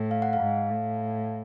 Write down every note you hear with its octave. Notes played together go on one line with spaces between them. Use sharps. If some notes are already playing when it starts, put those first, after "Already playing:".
Already playing: A2
F5
F#5
F5
G#2
A2